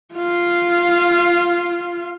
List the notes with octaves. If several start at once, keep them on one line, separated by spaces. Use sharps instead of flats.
F4 F5